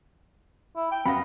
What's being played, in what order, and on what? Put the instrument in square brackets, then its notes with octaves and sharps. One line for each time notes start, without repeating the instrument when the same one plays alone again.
[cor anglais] E4
G5
[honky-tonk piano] F#2 F5 A#6 [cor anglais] B3 [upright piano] B5